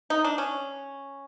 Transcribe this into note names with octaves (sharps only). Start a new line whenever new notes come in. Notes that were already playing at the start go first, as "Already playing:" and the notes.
D#4
D4
C#4